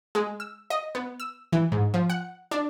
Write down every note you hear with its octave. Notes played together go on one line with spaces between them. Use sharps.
G#3
E6
D#5
B3
E6
E3
G#2
F3
F#5
D4